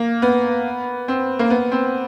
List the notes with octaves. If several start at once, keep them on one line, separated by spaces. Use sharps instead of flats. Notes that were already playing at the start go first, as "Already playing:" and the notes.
Already playing: A#3
B3
C4
A#3
B3
C4